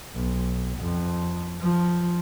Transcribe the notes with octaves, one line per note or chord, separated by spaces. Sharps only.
B1
F2
F3